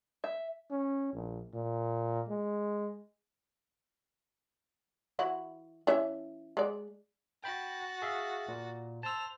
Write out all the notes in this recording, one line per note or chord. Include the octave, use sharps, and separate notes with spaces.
E5
C#4
A#1
A#2
G#3
E3 E4 F#4
E3 C#4 E5
G#3 D5
F#4 G5 B5 A6
G#4 E5 F5
A#2
C5 A5 E6 F7